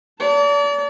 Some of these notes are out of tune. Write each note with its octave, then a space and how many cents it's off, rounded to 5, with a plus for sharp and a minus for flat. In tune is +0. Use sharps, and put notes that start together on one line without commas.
D5 -40 A5 +35